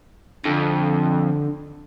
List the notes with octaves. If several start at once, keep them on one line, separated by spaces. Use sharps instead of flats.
F2 D3